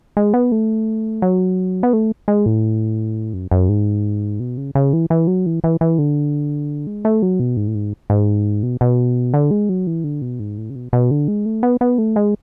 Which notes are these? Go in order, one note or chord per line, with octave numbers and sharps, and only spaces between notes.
G#3
B3
A3
F#3
B3
A3
G#3
A2
F#2
F#2
G#2
B2
C#3
C#3
E3
E3
F#3
E3
E3
E3
D3
G#3
A3
F#3
B2
G#2
A2
G#2
G#2
B2
B2
D3
G#3
F#3
E3
D3
B2
G#2
A2
C#3
B2
B2
D3
G#3
A3
B3
B3
A3
G#3